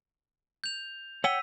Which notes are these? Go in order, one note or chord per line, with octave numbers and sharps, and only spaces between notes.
G6 F7
C#5 F#5 G5 E6 B6 D#7